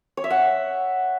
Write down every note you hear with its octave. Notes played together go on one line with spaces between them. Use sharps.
C#5
E5
F#5